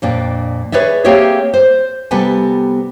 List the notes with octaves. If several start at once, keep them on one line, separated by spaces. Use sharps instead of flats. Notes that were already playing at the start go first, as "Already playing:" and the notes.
F2 A#2 D4
G#4 B4 C#5 D5 E5
A#3 C4 G4 G#4 C#5 E5
C5
C3 G3 B3 A4 B4 G#5